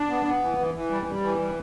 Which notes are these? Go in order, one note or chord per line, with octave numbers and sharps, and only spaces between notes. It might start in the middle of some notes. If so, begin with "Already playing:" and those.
Already playing: D4
B3
B3
E3
E3
E3
G3
G3
E3
G3